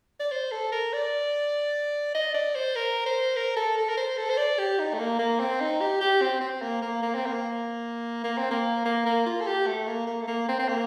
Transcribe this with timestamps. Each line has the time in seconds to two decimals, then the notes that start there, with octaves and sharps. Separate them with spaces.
0.20 D5
0.32 C5
0.52 A4
0.72 A#4
0.93 D5
2.15 D#5
2.34 D5
2.55 C5
2.76 A#4
3.06 C5
3.36 A#4
3.56 A4
3.78 A4
3.89 A#4
3.97 C5
4.17 A4
4.30 C5
4.37 D5
4.59 G4
4.79 D#4
4.94 A3
4.99 A#3
5.19 A#3
5.40 C4
5.61 D#4
5.81 G4
6.01 G4
6.22 C4
6.41 C4
6.62 A#3
6.82 A#3
7.03 A#3
7.15 C4
7.26 A#3
8.24 A#3
8.38 C4
8.51 A#3
8.85 A#3
9.06 A#3
9.26 F4
9.41 A4
9.47 G4
9.67 A3
9.87 A#3
10.07 A#3
10.22 A3
10.28 A#3
10.49 C4
10.59 C4
10.69 A#3